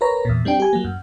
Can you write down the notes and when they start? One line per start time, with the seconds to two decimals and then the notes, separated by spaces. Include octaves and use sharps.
0.01 A#4 B4 C#5 A#5
0.25 E2 A#2
0.45 G3 C4 D4 G5
0.60 G4 G#5
0.73 F#3 A#3
0.84 F#2